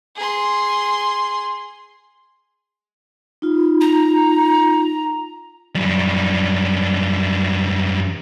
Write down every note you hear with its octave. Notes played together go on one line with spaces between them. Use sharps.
G#4 C6
D#4 F4
A#5
F#2 G3